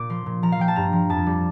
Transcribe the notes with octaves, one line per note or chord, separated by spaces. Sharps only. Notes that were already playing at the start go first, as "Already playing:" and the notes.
Already playing: A#2 D6
F3 C6
A#2
F3 A#5
F5
F3 G5
A5
G2 A#5
F3
F2 A5
G3